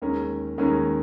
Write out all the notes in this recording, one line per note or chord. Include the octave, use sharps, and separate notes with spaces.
D#2 D#3 G#3 C#4 A#4
D#2 D#3 G#3 C#4 A#4